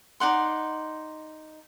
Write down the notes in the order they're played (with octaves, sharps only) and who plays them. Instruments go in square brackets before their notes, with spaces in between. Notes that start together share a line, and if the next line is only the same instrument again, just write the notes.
[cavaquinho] D#4 D5 F#5 C6